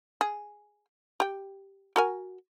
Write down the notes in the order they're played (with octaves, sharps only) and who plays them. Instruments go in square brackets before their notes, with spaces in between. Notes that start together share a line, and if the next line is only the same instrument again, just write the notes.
[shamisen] G#4
G4 G5
F#4 A#4 G#5